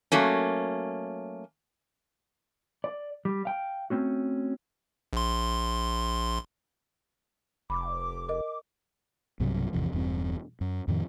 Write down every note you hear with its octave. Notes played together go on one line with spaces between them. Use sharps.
F#3 A3 A#3 C#4
D5
G3
F5 G5
A3 C4 C#4 F#4
A#1 C6
F1 B5 D6
A#4 D#5
B1 G2 C3 F#3
G#1 E2 C3 F3
E1 E2 G2 C4
F#2
F2 A2 D#3 F3